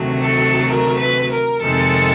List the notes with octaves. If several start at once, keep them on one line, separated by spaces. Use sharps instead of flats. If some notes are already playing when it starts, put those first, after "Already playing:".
Already playing: D2 C3 D#3 F#3 A3
A4
A#4
B4
A#4
F2 C3 D#3 G#3 A4